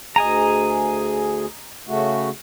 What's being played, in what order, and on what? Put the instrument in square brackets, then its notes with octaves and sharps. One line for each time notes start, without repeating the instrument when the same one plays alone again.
[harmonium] D2 G#4 [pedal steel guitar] D#5 G#5 A#5
[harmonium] C#3 A3 F#4